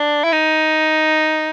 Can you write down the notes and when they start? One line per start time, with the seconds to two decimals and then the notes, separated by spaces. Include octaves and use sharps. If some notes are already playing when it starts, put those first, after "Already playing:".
Already playing: D4
0.24 E4
0.32 D#4